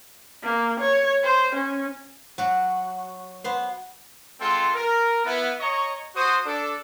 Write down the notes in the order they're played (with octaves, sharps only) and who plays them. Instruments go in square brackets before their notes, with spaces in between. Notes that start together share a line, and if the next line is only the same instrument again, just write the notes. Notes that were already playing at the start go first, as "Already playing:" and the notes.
[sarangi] A#3
C#5
C5
C#4
[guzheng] F#3 F#4
B3 C5
[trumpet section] G#3 C4 F4 A4 F#5 C6
A#4
B3 E4
C#5 D#5 A#5 C#6
F#4 C5 D#6
D4 A4